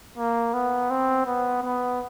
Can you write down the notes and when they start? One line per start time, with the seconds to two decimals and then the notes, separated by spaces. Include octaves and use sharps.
0.18 A#3
0.54 B3
0.90 C4
1.26 B3
1.63 B3